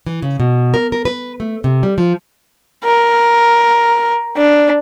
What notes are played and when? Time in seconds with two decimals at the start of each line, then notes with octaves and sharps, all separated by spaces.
0.07 E3
0.22 C#3
0.40 B2
0.74 A#4
0.92 A#4
1.05 B4
1.40 A3
1.64 C3
1.83 G3
1.98 F3
2.84 A#4
4.37 D4